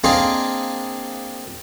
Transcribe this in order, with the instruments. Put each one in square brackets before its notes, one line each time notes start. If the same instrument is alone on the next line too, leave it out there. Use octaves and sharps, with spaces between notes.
[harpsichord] A#3 C4 D4 G#4 D#5 F5